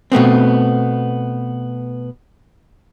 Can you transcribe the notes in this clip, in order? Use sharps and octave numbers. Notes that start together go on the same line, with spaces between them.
B2 A3 B3 C4